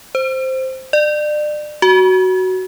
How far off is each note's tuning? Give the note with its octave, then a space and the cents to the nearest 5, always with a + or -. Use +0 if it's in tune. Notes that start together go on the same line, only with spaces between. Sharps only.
C5 +0
D5 +35
F#4 +10